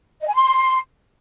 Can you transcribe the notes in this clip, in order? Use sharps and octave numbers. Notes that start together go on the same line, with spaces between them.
D#5
G#5
C6